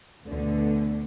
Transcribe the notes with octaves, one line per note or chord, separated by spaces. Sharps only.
D2 B2 D3